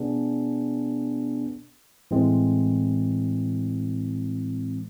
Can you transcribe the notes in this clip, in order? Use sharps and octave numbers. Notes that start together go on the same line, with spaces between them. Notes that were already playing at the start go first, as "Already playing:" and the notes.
Already playing: B2 B3 D4 G#4
A2 E3 G#3 C4